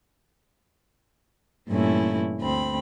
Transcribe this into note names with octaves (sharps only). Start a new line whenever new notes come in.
G2 A#2 E3 A3 C#4 E4
D2 C4 B5